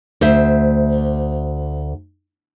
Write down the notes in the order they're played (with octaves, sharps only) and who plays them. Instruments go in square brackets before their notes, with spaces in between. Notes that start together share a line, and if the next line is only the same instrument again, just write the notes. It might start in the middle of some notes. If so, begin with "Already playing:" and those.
[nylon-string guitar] D2 C5 E5